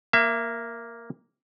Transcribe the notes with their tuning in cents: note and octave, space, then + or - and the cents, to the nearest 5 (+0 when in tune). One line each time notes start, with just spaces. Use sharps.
A#3 +0 E5 +30